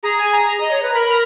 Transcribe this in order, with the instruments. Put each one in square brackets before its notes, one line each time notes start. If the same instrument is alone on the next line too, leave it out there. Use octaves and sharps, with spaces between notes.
[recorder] G#4 [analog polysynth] A#5
[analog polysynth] G#5
A#5
[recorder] D#5
C#5
B4
[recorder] A#4 [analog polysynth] B5
[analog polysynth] A#5